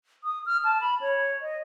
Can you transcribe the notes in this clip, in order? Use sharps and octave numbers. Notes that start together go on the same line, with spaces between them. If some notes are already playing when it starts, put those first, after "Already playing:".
D#6
F6
A5
B5
C#5
D#5